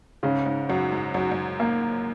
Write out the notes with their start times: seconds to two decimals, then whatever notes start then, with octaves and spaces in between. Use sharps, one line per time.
0.23 G#2 C#3
0.46 G#2
0.69 F#2 F#4
0.92 G#2
1.14 F#2 F#4
1.32 F#2
1.60 A#3